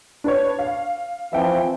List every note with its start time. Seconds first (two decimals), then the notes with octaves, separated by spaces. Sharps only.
0.24 D4 B4 C#5
0.59 F5
1.33 E3 F3 C4 E5 G5